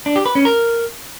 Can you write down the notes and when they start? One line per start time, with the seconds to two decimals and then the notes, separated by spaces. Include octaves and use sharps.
0.06 D4
0.16 G4
0.26 B4
0.35 C#4
0.45 A#4